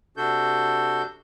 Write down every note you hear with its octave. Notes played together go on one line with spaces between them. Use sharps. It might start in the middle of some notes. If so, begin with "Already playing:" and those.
C3 D4 F#4 A4 G6